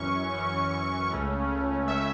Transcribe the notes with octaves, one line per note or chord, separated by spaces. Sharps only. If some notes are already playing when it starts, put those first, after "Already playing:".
Already playing: F#2 E3 C#4 C#6
F#2 E3 C#4
C#2 C#3 A3 C#4
C#2 C#3 A3 C#4 E5